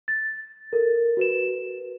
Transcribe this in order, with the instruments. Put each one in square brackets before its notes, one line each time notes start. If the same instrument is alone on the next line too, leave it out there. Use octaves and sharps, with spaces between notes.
[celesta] A6
A4 A#4
F#4 B4 E7